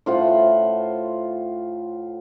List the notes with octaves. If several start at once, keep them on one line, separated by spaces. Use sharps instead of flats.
A2 F4 C5 F#5